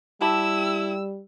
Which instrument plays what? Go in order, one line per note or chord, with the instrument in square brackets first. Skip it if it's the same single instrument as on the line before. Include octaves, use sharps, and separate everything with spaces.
[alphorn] G3 [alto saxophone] E4 [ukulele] G4 A5 B5 [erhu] E6